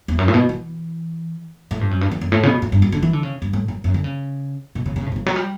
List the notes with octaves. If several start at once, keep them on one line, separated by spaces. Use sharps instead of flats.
E2
F#2
A2
B2
E3
A2
G2
F#2
G2
E2
F#2
A2
C#3
B2
A2
G2
F#2
D3
E3
D3
C#3
G2
A2
F#2
F#2
D3
C#3
B2
C#3
C#3
A2
B2
C#3
F#3
G3